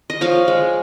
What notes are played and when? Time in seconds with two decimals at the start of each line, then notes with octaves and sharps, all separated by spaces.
0.10 D#5
0.21 F3 C#5 F5
0.48 G#3